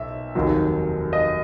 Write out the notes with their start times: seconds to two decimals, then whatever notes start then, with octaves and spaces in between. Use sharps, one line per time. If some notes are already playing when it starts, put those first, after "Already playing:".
Already playing: B1 E5
0.35 F1 D#2 D#3 F#3
1.13 D#5